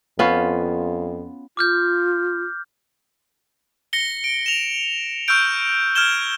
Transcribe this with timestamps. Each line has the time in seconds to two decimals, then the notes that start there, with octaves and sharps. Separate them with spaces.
0.19 F2 B3 C#4 F4
1.57 F4 D6 F6 G6
3.93 A#6 C#7 G7
4.24 D7
4.46 E7 F7
5.28 C#6 E6 F6 G6 D7
5.95 F6 G#6 E7 G7